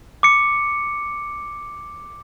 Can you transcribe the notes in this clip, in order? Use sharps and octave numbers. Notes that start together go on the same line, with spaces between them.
D6 C#7